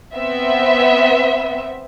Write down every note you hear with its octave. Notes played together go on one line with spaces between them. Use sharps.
B3 C4 E5